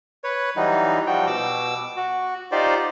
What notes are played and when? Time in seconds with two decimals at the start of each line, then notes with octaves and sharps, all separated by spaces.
0.24 B4 C#5
0.56 E3 F#3 G3 D#4
1.07 F3 G3 F#4 G5
1.27 B2 D6 E6
1.96 F#4
2.52 D#4 F4 G4 C5 D5